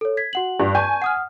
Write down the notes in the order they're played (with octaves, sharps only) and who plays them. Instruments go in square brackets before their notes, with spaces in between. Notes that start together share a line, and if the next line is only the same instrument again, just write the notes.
[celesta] A4 C#5
G#6 B6
F#4 F#5 F#7
[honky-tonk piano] G2
[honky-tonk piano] G#5 [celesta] A5 C#6 G6
[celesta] F#5 D#6 F6